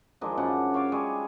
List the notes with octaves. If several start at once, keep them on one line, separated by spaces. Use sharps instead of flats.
D#3 F3 G#3 D4
F#2 C#3 D4 F#5
C#5 F5 A5 D6
G3 G#3 C#5 G#5